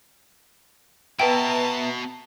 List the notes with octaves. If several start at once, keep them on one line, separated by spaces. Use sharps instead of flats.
B2 B3 B4 E5 G5 A5 A#5